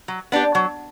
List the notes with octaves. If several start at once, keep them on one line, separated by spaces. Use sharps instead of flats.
F#3
B3 D4 G4
F#3